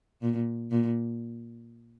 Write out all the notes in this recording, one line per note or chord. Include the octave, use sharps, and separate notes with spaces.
A#2
A#2